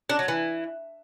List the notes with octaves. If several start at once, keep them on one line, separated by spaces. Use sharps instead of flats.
D4
F#3
E3